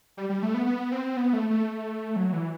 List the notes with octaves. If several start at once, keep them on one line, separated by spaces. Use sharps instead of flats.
G3
G3
A3
B3
B3
C4
B3
A3
A3
F#3
E3